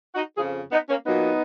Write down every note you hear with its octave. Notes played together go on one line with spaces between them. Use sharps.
D#4 F#4
F2 C#3 F3 F4 G#4
B3 D#4
A#3 C#4
A#2 F#3 B3 D#4